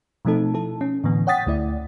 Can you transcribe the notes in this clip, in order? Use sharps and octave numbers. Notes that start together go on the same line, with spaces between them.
B2 F3 A3 C4 D#4 A4
E4 A4
C#4
A2 D3 E3 B3
C#5 F#5 G5 D#6 A6 B6
D2 A3 E4 D5